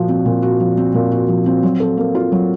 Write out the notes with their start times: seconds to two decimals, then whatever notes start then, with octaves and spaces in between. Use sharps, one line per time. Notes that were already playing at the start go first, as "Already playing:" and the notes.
Already playing: A#2 F3 F#4
0.09 C4
0.26 A#2
0.42 F#4
0.60 F3
0.77 C4
0.94 A#2
1.12 F#4
1.28 F3
1.46 C4
1.63 F#3
1.80 A4
1.97 A#3
2.15 F4
2.32 F#3